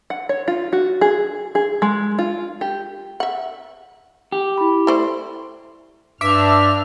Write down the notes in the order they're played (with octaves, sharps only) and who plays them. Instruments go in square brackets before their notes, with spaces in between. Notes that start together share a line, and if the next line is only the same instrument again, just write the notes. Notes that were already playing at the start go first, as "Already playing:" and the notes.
[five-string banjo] F#5
C#5
F4
F#4
G#4
G#4
G#3
F4
G4
[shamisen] E5 F#5
[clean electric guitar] G4
[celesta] E4 B5
[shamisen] A3 C5 D5
[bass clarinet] G2 [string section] D4 F6 [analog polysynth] E5 [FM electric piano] D6